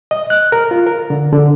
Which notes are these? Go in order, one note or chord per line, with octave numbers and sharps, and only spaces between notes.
D#5
F#6
A#4
F4
A#4
D3
D3